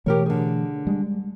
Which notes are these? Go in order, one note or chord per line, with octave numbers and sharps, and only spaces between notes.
B2 E3 A3 G4 A#4 C#5
D3 G#4
G3 G#3